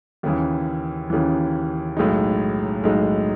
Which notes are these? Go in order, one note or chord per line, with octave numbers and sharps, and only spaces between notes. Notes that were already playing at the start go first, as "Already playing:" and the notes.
D#2 C#3 E3
D#2 C#3 E3
B1 A2 G#3 D#4
B1 A2 G#3 D#4